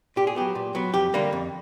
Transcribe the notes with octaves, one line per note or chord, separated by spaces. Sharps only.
A#2 G4
G#4
F#3 B3 G4
A#2
F#3 B3
F2 G4
D3 G3 A#3
F2